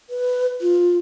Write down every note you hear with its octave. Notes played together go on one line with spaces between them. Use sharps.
B4
F4